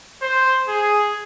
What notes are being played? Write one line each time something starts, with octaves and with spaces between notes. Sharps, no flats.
C5
G#4